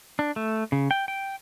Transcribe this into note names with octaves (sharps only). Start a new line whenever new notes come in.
D4
A3
C#3
G5
G5